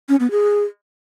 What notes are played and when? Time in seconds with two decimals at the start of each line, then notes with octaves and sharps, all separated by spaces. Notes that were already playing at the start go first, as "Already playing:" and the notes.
0.09 C#4
0.20 B3
0.31 G#4